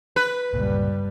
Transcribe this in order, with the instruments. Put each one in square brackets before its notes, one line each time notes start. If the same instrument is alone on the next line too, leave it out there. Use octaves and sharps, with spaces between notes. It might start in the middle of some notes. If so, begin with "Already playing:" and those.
[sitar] B4
[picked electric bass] G1 C#2 A#2 [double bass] G2 G3